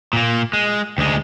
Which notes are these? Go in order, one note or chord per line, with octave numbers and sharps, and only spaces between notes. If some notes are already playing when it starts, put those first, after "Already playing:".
A#2 A#3
G#3
D2 G#3